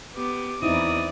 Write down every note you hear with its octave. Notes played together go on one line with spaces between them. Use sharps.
B3 G4 D6
E2 C4 D#4 E4 D5 D#6